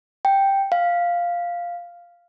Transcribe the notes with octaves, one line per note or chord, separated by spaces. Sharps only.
G5
F5